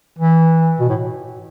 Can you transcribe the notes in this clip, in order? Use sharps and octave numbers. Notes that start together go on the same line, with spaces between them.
E3
B2
A2